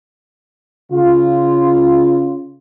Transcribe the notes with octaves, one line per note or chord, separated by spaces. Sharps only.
C#3 F4